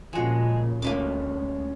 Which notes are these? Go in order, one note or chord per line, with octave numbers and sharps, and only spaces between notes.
A#2 C#3 F3 G#3 F#4 G#4
D2 G#3 A#3 C#4 D4 B4 D6